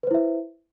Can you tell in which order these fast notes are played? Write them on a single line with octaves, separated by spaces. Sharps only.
B4 C5 E4 E5